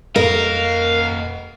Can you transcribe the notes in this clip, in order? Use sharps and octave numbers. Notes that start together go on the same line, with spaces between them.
F2 A#2 A#4 D#5 F5